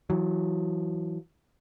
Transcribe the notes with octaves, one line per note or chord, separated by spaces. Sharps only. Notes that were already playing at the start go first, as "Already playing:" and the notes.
E3 F#3